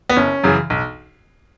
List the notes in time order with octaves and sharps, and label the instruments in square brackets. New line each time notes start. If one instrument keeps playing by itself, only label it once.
[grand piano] B3
F#1 C#4
F#2 C#3 E3
B1